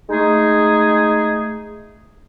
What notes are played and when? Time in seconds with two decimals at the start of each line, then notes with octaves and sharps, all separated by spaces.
0.09 G#3 A3 D#4 G#4